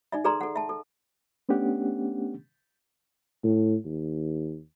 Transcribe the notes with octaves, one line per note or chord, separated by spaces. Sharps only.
D#4 D5 E5
G#4 A4 B4 D5 A#5 C6
A4 F#5
E5 A5
A4
A3 B3 C#4 D4 G4 F#5
A2
D#2